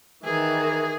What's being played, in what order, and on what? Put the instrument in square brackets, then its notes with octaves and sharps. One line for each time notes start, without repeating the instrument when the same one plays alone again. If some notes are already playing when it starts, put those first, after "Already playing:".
[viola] D#3 E3 [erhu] G#4